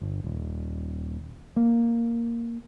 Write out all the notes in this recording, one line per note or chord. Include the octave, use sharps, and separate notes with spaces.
G1
D#1
A#3